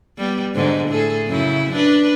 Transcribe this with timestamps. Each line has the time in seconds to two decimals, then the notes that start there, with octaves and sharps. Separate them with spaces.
0.18 G3 B3
0.55 G#2 D3 D#4
0.88 A2 G#4 A4
1.27 F#2 C#3 E4
1.73 D4 B4